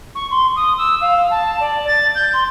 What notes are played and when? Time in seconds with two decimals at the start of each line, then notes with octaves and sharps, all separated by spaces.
0.15 C#6
0.31 C6
0.56 D#6
0.78 E6
1.01 F5
1.16 F5
1.30 A5
1.60 D5
1.87 A6
2.15 G6
2.33 C6